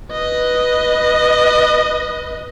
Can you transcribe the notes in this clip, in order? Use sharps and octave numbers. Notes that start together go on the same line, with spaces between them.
B4 D#5